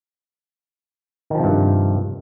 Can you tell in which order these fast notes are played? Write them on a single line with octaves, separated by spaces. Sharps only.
D#3 F3 C3 G2